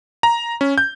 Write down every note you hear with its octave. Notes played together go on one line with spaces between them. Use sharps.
A#5
C#4
G6